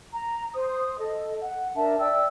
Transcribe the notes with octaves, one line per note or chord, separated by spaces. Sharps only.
A#5
C5 D#6
A4 D#5
F#5
D4 A#4 E5 A5
D5 E5 G5 E6